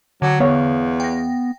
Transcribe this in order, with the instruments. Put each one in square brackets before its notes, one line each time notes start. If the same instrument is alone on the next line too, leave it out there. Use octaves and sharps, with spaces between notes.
[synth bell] D3 [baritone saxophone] F#3
[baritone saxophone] E2 [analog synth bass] B3 [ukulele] C#5 F5
[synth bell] G5 A#6